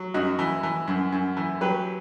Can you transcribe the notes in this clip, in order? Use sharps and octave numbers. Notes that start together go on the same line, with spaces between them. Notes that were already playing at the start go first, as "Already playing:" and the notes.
Already playing: F#3
F#2 D#4 F#4
E3
E3
F#2
F#2
E3
F#3 G4 B4